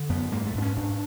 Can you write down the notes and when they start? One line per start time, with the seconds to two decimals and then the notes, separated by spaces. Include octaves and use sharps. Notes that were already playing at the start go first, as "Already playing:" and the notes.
Already playing: D3
0.09 F#2 B3
0.32 G#2 A#3
0.47 A3
0.55 G#2 D4
0.62 C#4
0.77 G#2 D4